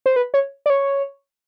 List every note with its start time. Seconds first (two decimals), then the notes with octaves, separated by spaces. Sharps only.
0.06 C5
0.16 B4
0.34 C#5
0.66 D5
0.70 C#5